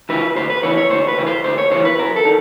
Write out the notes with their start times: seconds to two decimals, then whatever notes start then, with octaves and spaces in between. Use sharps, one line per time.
0.09 C#3 E3 B4
0.36 D2 C5
0.50 B4
0.63 C#3 E3 C#5
0.77 C#5
0.90 D2 C5
1.08 B4
1.18 C#3 E3
1.27 C5
1.44 D2 C5
1.58 C#5
1.71 C#3 E3 C5
1.85 B4
1.98 F#2 A#4
2.16 A4
2.25 D#3